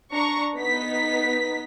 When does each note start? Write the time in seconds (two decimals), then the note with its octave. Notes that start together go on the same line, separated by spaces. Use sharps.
0.13 D4 A#5 C#6
0.56 B3 D#4 B6